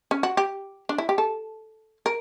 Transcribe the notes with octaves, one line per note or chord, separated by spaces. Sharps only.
C#4
F#4
G4
D4
E4
G4
A4
A#4